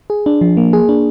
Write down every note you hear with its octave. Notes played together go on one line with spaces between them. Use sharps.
G#4
D4
F3
A#3
G#4
D4